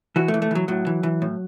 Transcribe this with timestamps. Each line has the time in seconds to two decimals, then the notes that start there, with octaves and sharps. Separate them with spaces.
0.16 E3 F#4
0.28 A3
0.34 E3
0.42 A3
0.51 E3 F#3
0.68 A2 F#3
0.87 E3
1.03 E3
1.22 A2